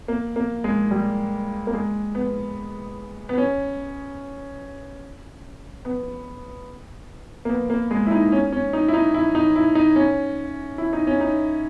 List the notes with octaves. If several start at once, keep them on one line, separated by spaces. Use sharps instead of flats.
A#3
A#3
G#3
G3
A#3
G#3
B3
B3
C#4
B3
A#3
B3
A#3
G#3
E4
D#4
C#4
C#4
D#4
E4
D#4
E4
D#4
E4
D#4
C#4
E4
D#4
C#4
D#4